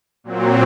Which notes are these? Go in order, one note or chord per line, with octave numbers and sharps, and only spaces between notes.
A#2 F#3 C4